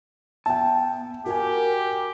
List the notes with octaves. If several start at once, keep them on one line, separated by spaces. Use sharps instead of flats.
B3 E5 G5 A5
F#4 G4 A#4 G#5